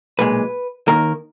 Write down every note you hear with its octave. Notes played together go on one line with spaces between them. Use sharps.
B1 A#2 G#3 B4
D#2 D#3 A#3 A#4